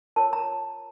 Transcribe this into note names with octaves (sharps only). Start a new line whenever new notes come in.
F4 A#4 C#5 A5
A#5